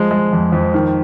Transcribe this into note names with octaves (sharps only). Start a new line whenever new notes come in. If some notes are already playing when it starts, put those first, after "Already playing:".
Already playing: F3 G#3
G#3
F2
F2
D#3